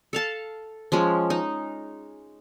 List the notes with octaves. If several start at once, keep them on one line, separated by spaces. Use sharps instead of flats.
A4 F5 A5
F3 G#3 C#4
D#4